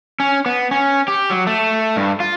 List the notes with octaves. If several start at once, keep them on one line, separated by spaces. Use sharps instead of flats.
C#4
B3
C#4
G4
F#3
A3
G2
F4